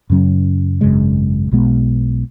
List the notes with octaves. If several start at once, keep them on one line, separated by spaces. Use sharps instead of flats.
F#2 C#3 F#3 C#4
G#1 F#2 C#3 G#3
B1 B2 G#3 B3